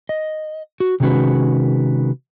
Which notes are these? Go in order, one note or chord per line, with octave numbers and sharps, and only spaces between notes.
D#5
F#4
C3 D#3 G#3 C#4 F#4 B4